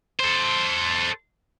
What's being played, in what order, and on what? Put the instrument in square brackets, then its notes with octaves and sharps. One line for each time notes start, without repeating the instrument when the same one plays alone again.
[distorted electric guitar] A4 C5